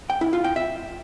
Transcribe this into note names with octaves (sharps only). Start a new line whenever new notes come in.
G5
E4
F4
G5
E5